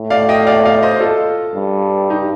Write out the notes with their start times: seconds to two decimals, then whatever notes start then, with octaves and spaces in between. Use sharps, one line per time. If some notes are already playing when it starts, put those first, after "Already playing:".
Already playing: A2
0.10 D5 F5
0.29 D#5 G5
0.47 D5 F5
0.65 D5 F5
0.83 C5 D#5
1.01 F4 A4
1.55 G2
2.09 D#4 G4